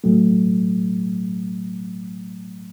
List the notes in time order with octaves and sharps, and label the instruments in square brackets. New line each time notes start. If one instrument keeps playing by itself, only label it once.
[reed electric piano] A2 F#3 A3